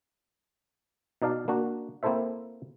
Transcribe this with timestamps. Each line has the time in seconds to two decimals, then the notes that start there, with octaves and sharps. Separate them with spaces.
1.22 B2 D#4 D5 F5 A5
1.48 A#3 D4 F#4
2.03 A#3 C4 E4 A4 C5 E5